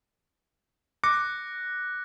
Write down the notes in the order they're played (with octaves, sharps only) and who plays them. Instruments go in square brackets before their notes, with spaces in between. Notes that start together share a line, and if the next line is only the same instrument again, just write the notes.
[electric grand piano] D6 [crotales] F#6 A#6 C#7